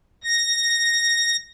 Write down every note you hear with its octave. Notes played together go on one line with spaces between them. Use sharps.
A#6